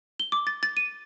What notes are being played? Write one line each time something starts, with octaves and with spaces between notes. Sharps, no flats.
G7
D6
A6
A6
D#7